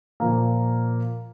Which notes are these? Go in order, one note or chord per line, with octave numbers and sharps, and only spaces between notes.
A#2 F3 A#3